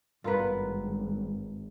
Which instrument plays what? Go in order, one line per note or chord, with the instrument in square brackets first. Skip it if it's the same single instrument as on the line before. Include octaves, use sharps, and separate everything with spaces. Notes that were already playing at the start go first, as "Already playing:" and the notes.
[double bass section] G#1 [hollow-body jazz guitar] G2 B3 [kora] F4 A#4 B4